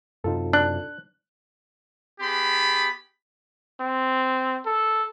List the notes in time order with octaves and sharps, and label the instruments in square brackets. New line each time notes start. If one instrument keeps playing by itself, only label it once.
[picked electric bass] F#2 C3 [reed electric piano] D#4 F4 A4
[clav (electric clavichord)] D4 [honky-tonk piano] F#6
[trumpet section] B3 G4 G#4 B5
[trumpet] C4
A4